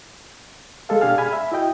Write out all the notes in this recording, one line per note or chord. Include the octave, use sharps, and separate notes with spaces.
G#3 G#4 A4 F5
B2 D4 G4 F5 G#5 F6
G#4 G#5 B5 F6
E5 B5
E4 F#4 D#5 G5